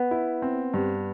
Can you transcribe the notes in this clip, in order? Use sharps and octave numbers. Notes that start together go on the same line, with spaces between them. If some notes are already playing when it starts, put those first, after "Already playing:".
Already playing: B3
E4
C4
G2